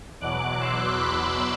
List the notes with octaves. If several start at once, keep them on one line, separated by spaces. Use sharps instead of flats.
E2 B2 F#3 D6 F#6
C6 E6
B5 D6